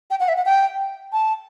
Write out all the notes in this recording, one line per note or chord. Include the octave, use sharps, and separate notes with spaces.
G5
F#5
E5
F#5
G5
A5